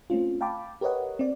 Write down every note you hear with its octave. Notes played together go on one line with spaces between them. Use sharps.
A3 C4 C#4 F4
F5 G5 A5 B5 D6
G4 A#4 B4 C#5 D#5 F#5
C4 D5